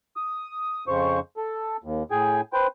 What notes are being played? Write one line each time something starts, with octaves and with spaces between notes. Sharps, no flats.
D#6
F2 C#3 C5 C#6
A4
D#2
A2 G#4 G5 G#5
B4 C5 G5